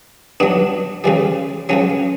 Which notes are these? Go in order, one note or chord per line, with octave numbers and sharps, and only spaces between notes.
G2 F#3 B3 D4
C#2 C#3 E3 G3
C#2 C#3 F#3 C#4